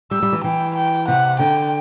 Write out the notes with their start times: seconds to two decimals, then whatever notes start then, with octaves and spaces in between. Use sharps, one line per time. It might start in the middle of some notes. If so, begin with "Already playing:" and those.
0.11 G3 E6
0.22 G3
0.32 E3
0.44 E3 G5
0.76 G5
1.08 C3 F#5
1.39 D3 G5